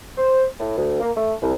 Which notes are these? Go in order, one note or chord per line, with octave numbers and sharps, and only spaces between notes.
C5
A2
D2
A#3
A3
C2